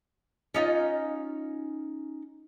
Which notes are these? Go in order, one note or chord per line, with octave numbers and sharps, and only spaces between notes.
C#4 D#4 F4